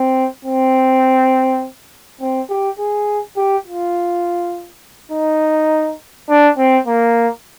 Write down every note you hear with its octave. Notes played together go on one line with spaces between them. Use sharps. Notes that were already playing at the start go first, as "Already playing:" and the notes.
Already playing: C4
C4
C4
G4
G#4
G4
F4
D#4
D4
C4
A#3